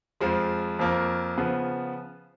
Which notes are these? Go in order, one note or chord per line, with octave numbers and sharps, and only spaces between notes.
F2 F3 G#3
F2 F3 A#3
C#3 F3 B3